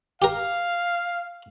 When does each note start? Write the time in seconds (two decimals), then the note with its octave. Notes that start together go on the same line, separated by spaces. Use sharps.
0.22 G4 A#4 F5